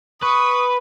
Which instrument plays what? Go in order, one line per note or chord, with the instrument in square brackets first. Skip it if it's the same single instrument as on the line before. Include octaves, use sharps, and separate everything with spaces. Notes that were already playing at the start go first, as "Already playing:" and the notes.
[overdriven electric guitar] B4 [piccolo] C#6 [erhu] D#6